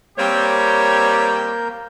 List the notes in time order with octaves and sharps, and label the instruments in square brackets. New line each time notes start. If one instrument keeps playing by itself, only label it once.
[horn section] G3 C4 G4 [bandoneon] A#3 A#4 G6 [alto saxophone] C#5